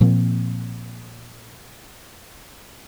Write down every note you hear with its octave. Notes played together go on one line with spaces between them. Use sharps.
A#2 F3 A#3 C4